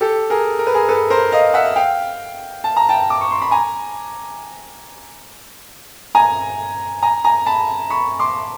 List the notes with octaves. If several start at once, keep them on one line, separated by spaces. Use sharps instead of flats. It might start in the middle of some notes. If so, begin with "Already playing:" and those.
G4 A4
G#4 A#4
A#4
B4
G#4 A#4
A4 B4
A#4 C5
D#5 F5
E5 F#5
F5 G5
A5
A#5
G5 A5
D6
C#6
C6
B5
G#5 A#5
G#5 A#5
G#5 A#5
G#5 A#5
A5 B5
B5 C#6
C6 D6